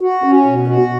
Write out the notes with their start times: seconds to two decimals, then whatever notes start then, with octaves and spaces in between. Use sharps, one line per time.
0.01 F#4
0.24 C#4
0.46 B2
0.68 F#4